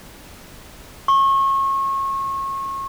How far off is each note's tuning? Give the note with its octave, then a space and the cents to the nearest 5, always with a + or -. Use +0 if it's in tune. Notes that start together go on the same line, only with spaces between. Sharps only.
C#6 -30